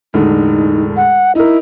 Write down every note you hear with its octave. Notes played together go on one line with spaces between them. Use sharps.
E1 A2 D3 D#4
F#5
D#4 E4 A#4